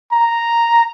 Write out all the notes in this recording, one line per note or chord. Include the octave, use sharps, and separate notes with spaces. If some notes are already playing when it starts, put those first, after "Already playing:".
A#5